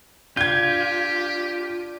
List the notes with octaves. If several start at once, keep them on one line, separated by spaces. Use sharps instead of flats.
D4 F4 G4 G6 G#6